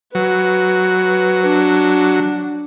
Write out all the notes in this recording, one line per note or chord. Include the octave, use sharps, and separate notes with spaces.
F#3 B4
D4